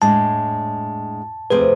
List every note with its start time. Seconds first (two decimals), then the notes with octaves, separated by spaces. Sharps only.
0.01 A2 G#3 D4 A5
1.50 C3 F3 A3 C4 G#4 B4